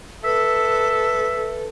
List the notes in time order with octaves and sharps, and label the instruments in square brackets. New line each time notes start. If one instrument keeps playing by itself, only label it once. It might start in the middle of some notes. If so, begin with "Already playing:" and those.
[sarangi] A4 [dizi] B4 [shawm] E5